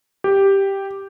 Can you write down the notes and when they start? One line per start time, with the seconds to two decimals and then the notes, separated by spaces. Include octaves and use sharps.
0.24 G4